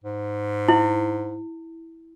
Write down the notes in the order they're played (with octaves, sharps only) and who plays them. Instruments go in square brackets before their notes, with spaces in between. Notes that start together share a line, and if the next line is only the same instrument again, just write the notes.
[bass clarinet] G#2
[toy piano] E4